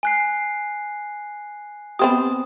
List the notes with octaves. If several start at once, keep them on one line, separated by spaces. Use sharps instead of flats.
G#5 F#6 C7
B3 C4 G4 D#6